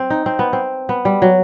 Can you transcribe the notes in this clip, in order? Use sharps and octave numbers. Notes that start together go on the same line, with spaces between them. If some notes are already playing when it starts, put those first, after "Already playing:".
Already playing: C4
D#4
C4
B3
C4
B3
G3
F#3